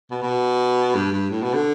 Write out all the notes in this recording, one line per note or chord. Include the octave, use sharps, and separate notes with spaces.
B2
B2
G2
G2
A2
B2
D3